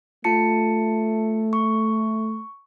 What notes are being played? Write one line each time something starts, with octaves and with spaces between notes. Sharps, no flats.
A3 F4 A5 C#7
C#6